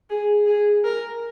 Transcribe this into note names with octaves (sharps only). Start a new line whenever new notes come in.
G#4
G#4
A#4